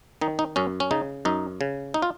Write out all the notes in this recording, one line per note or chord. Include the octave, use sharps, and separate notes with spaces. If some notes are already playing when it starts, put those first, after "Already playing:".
D#3 D#4
D#4
F#2 C#4
C#4
C#3 D#4
F#2 D#4
C#3
D#4
F4